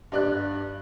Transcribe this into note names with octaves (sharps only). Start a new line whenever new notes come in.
G2 D5 F#6